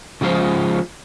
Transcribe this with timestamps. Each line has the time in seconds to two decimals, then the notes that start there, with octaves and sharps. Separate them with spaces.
0.21 C#3 F3 G#3 F4 C5